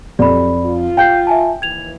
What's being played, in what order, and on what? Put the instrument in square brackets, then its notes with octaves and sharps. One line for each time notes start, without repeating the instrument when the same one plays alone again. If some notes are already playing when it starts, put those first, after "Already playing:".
[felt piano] F2 [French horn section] F#3 G4 [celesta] D5 B5
[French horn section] F4
[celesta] F5 G6 C7 [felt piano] G5
[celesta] E5 G#5 A5
[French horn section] D#2 E3 [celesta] G#6 F7